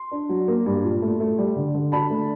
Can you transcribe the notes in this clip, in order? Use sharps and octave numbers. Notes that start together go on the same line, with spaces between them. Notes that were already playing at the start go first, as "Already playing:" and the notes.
Already playing: C6
D4
F#3
A#3
G2
A#2
A3
A3
G3
D3
D3
D4 A5 B5
A3